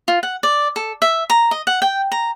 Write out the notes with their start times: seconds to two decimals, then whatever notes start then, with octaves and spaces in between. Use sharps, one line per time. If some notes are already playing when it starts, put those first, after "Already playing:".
0.08 F4
0.23 F#5
0.43 D5
0.76 A4
1.02 E5
1.30 A#5
1.51 D#5
1.67 F#5
1.82 G5
2.12 A#5